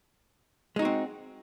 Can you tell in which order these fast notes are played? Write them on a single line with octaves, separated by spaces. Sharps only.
G#3 D#4 F#4 C4